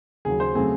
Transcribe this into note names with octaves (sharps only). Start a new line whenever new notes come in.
D#2 C#3 F#3 G#4
C5
C#3 F#3 A3 C4 G#4